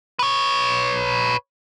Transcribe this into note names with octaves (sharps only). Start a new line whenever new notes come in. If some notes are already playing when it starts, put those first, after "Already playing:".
B4 C#5